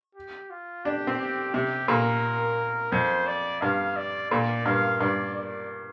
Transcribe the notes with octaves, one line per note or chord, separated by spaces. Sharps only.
G4
F4
D4 G4
C4
G4
C3 G4
A#2 A#4
F2 C5
D5
G2 F5
D5
A#2 D5
G2 F5
G2 D5
D5